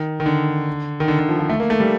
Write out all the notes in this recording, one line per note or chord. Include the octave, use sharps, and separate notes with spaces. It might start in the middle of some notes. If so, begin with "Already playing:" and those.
Already playing: D#3
D#3
D3
D#3
D3
D3
F3
F3
A3
A#3
A3
G3